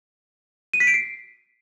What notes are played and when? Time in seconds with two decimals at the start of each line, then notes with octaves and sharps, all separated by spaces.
0.73 D#7
0.80 B6
0.87 D7
0.94 C7